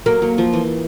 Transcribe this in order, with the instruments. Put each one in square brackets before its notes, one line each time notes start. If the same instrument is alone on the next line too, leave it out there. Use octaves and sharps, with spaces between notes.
[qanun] F#3 [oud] A#3
[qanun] F#3
F3
E3